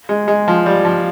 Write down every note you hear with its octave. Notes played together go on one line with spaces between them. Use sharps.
G#3
G#3
F3
G3
F3